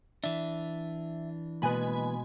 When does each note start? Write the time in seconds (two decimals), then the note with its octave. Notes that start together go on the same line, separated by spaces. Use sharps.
0.24 E3 D4 E5
1.62 B2 G#3 A#3 B3 B4 G#5 B5